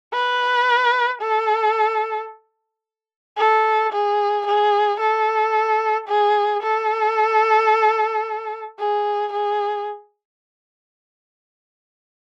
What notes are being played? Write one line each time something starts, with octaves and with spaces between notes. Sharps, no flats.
B4
A4
A4
G#4
G#4
A4
G#4
A4
G#4
G#4